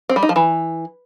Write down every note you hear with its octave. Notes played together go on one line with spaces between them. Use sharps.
C4
G3
D#4
F3
E3